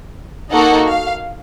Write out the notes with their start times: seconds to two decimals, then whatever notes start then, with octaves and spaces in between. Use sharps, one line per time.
0.52 A#3 D#4 F#4 A4 F#5
0.86 F5